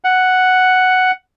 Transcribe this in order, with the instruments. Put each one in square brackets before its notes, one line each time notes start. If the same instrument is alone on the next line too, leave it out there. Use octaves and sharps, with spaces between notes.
[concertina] F#5